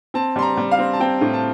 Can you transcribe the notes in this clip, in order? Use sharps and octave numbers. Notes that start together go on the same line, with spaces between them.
C4 A5
G3 C6
A#5
G3
F5
C4
A5
C4 G5
A2
A5